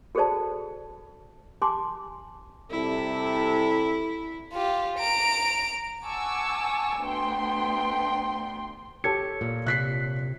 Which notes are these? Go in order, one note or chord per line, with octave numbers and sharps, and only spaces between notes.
F#4 G#4 A4 C5 D5 A5
G4 G#5 A5 C6 D6
C3 G3 E4 A4
F4 G4
A#5 D7
F#5 G#5 A5 C#6 D6 E6
D2 A3 B3 G5 C6
G4 A4 C#5 G#6 C#7
A#2
C3 F#6 B6 C7